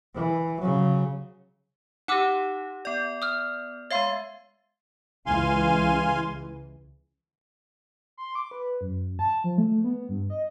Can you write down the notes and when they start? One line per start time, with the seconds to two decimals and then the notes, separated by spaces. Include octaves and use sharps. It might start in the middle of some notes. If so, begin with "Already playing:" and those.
0.15 E3
0.60 C#3 F#3
2.08 D#4 G4 F#5 D6 E6
2.85 B3 D5
3.22 D#6 F6
3.91 G#3 C#5 E5 F5 C6
5.26 C#2 E3 G#3 F5 G#5 C6
8.18 C6
8.35 D6
8.51 B4
8.81 F#2
9.19 A5
9.44 F3
9.58 A3
9.84 B3
10.09 G2
10.30 D#5